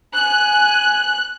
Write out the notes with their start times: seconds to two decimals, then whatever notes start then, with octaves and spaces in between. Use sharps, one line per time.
0.14 G#5 F#6